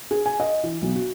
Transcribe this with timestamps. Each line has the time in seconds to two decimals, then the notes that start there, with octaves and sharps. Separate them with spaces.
0.11 G#4
0.26 G#5
0.40 D#5
0.64 E3
0.82 B1
0.95 F#4